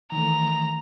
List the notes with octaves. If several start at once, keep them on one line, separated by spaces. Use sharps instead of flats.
D#3 E3 A3 A#5